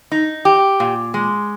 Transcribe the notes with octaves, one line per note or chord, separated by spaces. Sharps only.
D#4
G4
A#2
G#3